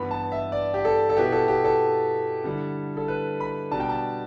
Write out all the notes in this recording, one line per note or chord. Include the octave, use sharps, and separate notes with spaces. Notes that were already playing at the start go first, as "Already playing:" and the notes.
Already playing: G2 E3 B3 B5
A5
E5
D5
G4
A4
A4
B2 B3 E4 G4
A4
G4
A4
D3 G3 E4
A4
B4
B5
B2 G3 D4 A5
G5
A5